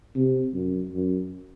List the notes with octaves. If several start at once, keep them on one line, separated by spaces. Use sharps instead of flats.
C3
F#2
F#2